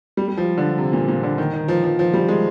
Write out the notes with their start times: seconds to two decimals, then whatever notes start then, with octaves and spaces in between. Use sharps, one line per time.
0.17 G3
0.28 G3
0.37 F3
0.58 D3
0.78 C3
0.93 A#2
1.08 A#2
1.23 D3
1.38 D#3
1.53 D#3
1.68 F3
1.84 F3
1.99 F3
2.13 G3
2.29 G#3